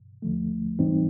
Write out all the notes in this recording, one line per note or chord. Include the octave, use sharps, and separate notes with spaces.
D#2 D3 F3 A3
G#2 E3 G3 C4 D#4